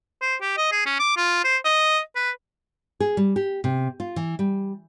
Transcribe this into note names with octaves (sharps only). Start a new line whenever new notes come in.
C5
G4
D#5
G#4
C#4
D6
F4
C5
D#5
B4
G#4
G3
G4
C3
F4
E3
G3